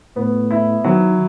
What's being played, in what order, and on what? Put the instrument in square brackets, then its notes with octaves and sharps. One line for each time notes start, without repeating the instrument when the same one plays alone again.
[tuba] A2 [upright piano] B3
[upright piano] E4
[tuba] D#3 [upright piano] F#3